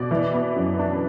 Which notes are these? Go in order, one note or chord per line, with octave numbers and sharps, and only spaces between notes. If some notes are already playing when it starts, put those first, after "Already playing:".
Already playing: B2 D5
E3
B3
F#2
D4